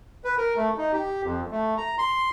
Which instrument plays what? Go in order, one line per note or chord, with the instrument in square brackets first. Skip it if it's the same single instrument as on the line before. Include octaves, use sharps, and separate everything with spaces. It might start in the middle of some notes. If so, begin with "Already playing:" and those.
[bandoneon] B4
A#4
A3
D#4
G4
F2
A3
A#5
C6